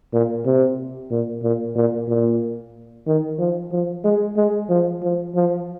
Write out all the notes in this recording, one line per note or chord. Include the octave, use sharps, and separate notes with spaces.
A#2
C3
A#2
A#2
A#2
A#2
D#3
F3
F3
G#3
G#3
F3
F3
F3